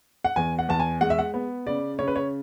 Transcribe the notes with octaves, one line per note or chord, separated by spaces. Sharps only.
F#5
E2 G#5
F#5
E2 A5
G#5
G#3 F#5
E5
F#5
B3
C#3 D5
C#3 C#5
B4
C#5